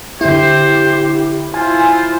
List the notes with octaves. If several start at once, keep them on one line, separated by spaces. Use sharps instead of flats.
D3 E4 G4 C5
E4 F4 C5 G#5